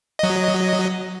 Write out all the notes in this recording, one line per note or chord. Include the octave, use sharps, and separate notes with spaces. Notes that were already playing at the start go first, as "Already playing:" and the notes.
F#3 D#5